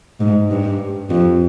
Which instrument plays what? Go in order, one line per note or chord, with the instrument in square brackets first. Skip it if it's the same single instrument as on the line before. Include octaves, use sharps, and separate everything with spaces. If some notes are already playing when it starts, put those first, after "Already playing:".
[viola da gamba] G#2
G2
F2